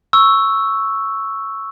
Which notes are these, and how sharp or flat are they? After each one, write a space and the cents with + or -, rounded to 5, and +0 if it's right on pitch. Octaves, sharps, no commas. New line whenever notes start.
C#6 +0 E6 +0